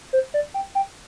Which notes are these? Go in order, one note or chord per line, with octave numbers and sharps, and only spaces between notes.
C5
D5
G5
G5